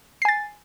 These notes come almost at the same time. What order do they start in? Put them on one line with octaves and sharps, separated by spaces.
C7 G#5 A6